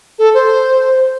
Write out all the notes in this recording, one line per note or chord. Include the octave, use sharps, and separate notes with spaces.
A4
C5